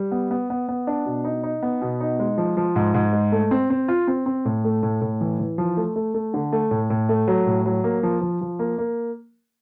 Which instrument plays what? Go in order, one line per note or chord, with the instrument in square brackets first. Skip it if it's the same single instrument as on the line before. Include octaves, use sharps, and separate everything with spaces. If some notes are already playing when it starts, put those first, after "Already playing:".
Already playing: [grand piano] G3
B3
B3
B3
B3
D4
B2
D#4
D#4
B3
B2
D#4
G#3
F3
F3
G#2
G#2
G#3
A3
C4
C4
F4
C4
C4
A2
A3
A2
A2
E3
E3
F3
A3
A3
A3
D3
A3
A2
A2
A3
F#3
A2
F#3
A#3
F3
F3
F3
A#3
A#3